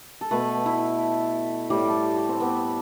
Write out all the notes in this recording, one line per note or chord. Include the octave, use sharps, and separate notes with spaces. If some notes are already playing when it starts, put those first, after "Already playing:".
A4
B2 A3 B4
E4
A2 G3 G4
A4
G4
C4
B3